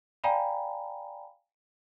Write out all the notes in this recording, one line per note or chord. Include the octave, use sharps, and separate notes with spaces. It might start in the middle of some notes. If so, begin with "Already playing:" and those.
D5 F5 G5 G#5 A#5 B5